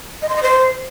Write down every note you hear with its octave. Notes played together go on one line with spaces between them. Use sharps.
D#5
C6
D#5
C5